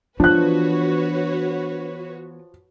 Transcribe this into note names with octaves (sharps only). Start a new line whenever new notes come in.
E3 F3 B3 D4 F#4 B4 C#5 F#6